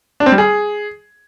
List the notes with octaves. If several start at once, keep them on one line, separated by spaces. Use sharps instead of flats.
D4
C4
G3
G#4